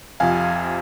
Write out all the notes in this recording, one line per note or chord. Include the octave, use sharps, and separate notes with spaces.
F2 C3 F3 F5 G#5